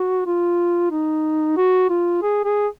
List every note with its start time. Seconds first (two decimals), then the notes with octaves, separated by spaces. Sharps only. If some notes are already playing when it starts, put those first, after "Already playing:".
Already playing: F#4
0.26 F4
0.91 D#4
1.57 F#4
1.90 F4
2.22 G#4
2.44 G#4